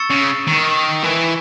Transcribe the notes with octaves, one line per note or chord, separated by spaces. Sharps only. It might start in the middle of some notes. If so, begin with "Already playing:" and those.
Already playing: C#6 E6 A6 C#7 E7
C#3
D#3
E3